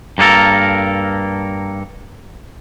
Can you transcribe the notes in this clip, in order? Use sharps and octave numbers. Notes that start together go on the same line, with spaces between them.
G2 A#3 D4 A4 A#4